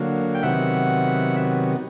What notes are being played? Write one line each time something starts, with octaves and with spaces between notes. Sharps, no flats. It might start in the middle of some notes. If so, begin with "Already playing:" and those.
Already playing: D3 F#3 A#3
G5
C3 D#3 F#3 B3 E5 F#5